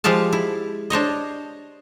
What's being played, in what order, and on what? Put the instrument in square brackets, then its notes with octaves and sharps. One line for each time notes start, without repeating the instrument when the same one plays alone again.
[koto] F3 G#3 G4 F5 A5
E4
D4 C5 C#5 D#5